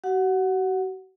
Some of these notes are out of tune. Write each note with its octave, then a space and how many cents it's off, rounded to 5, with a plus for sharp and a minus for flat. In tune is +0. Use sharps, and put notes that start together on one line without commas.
F#4 +40 F#5 -5